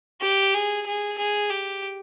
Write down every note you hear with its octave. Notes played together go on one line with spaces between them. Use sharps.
G4
G#4
G#4
G#4
G4